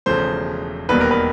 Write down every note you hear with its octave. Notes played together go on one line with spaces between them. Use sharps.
E1 E2 C#3 F3 A3 C5
E1 D#2 D#3 G3 B3 B4
A#4
B4